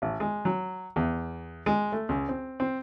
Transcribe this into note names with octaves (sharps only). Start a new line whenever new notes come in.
A1
G#3
F#3
E2
G#3
A3
C#2
C4
C4